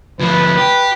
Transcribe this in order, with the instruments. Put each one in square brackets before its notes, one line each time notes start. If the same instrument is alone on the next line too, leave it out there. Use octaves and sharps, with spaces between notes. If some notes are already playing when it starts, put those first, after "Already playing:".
[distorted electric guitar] D2 F3 [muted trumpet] B4
[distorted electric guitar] G4